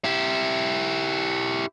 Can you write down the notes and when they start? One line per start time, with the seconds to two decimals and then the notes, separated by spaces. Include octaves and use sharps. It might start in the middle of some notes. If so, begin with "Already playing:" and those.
0.04 E4 G4